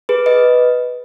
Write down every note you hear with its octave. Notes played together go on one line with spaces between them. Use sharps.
G#4 B4
B4 D#5